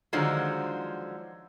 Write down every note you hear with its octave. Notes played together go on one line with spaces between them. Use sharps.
D3 D#3 F3 F#3 G#3